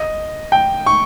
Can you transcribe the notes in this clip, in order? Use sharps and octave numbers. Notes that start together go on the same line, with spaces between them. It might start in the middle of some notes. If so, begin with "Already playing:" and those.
Already playing: D#5
G5
C#6